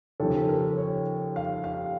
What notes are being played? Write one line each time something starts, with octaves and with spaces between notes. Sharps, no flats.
D#2 C#3 F3 A4
A#4
C#5
F5
F5